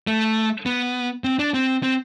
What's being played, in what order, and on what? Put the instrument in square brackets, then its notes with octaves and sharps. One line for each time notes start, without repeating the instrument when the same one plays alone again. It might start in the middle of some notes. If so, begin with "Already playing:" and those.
[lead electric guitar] A3
B3
C4
D4
C4
C4